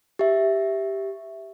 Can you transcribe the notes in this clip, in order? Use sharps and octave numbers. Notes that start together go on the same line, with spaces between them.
G4 E5